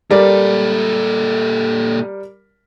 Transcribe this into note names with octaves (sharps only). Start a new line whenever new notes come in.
A#2 G3 A4 A#4 D5